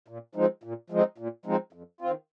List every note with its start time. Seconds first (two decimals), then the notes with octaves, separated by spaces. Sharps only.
0.08 A#2
0.35 F3 G#3 C4 D#4
0.63 A#2
0.90 F3 G#3 C4 D#4
1.18 A#2
1.46 F3 G#3 C4 D#4
1.73 F2
2.01 D#3 C4 F4